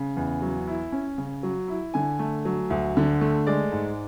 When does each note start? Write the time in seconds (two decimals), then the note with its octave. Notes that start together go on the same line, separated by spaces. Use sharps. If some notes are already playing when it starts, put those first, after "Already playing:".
Already playing: C#3
0.16 E2
0.42 F#3
0.67 E4
0.92 C#4
1.18 C#3
1.43 F#3
1.68 E4
1.94 D3 G#5
2.19 A3
2.45 F#3
2.70 D2
2.97 D3
3.21 A3
3.47 G#3 D5
3.72 G#2